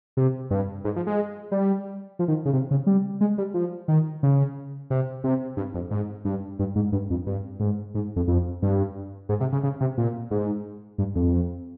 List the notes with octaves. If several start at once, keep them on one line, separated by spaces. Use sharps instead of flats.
C3
G2
G#2
F3
G#3
G3
F3
D#3
C#3
C3
C#3
G3
G#3
G3
F3
D#3
C#3
C3
C3
G2
F2
G#2
G2
G2
G#2
G2
F2
G2
G#2
G#2
F2
F2
G2
G#2
C3
C#3
C#3
C3
A#2
G#2
G2
F2